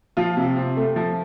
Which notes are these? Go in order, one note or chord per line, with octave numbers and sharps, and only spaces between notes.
F3 F4
C3
C4
A3
F3